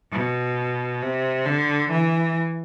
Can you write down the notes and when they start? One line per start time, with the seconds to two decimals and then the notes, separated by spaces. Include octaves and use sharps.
0.12 B2
1.02 C3
1.45 D3
1.91 E3